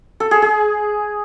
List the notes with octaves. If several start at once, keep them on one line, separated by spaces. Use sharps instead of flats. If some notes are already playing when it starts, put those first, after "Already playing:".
A4
G#4
G#4